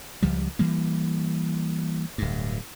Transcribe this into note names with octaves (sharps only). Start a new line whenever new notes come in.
C#2 F3 G3
E3 G3 A#3
D1 G2